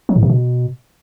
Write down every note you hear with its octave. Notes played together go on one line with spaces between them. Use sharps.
F#3
A2
C3
B2